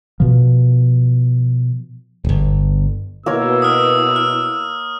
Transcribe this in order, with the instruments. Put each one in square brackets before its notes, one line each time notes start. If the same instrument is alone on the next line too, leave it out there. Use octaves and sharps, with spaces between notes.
[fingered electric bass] B2 F3
[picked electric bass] D1 G1
[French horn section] B2 E4 [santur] A#3 A#4 C#5 [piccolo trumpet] E6
[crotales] D#6 F6
F6